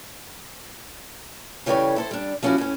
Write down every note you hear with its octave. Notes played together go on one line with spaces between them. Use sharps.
C#3 E3 G3 A3 G4 C#5
E4 A4 C5
G3 D4
F3 A#3 C#4 D#4 E4 F#4
A2 C#4